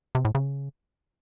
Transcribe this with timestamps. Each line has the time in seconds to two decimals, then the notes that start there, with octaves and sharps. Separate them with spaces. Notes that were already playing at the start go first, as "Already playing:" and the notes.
0.15 C3
0.25 A2
0.35 C#3